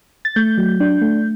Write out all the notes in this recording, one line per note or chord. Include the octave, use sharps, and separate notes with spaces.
A6
A3 G6
F#3
D4
A3